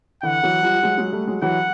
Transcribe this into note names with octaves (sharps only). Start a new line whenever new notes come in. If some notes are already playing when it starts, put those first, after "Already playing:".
D3 E3 F#5
E3 F#3
F3 G3
F#3 G#3
F#3 G#3
G3 A3
F#3 G#3
E3 F#3 F#5